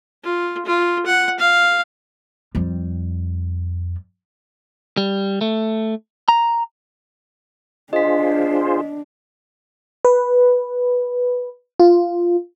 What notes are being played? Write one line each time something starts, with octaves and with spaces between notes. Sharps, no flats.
F4
F4
F#5
F5
F2 G3
G3
A3
A#5
D4 F4 G#4 C5 D#5 B6
B4
F4